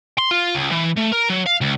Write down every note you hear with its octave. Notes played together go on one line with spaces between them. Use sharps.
C6
F4
C#2
E3
A3
A#4
F#3
F5
C#2